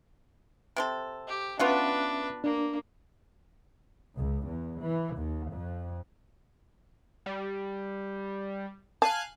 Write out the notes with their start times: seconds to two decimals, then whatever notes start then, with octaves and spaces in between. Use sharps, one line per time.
0.76 C3 C4 A4
1.27 G4
1.59 B3 C#4 D4 F4 F#4 B4 E5
2.44 A#3 D4
4.17 C#2
4.48 E2
4.82 E3
5.15 D#2
5.52 F2
7.26 G3
9.02 F5 G#5 A5 F#6